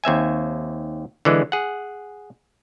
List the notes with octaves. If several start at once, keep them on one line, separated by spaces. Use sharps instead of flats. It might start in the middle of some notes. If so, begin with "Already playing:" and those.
D#2 C4 E5 G#5
D3 E3 G#3
G#4 F#5